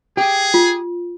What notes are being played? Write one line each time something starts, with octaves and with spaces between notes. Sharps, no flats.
G4 G#4
F4